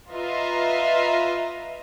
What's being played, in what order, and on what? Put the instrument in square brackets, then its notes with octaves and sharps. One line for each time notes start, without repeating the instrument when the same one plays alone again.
[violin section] F4 B4 D#5 E5 A#5